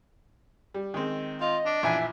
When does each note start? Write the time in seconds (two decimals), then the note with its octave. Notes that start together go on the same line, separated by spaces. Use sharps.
0.74 G3
0.94 D#3 G#3 C4
1.41 F4 D#5
1.66 D4
1.83 A#1 E3 E5 G#5